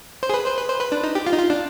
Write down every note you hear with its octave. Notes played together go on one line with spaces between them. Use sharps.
C5
G#4
B4
C5
B4
C5
B4
D4
D#4
G4
F4
D#4
F4
D4